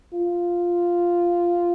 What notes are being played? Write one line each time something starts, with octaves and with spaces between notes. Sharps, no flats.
F4